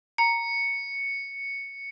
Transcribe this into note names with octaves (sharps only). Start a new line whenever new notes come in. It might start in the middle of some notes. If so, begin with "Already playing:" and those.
A#5 C#7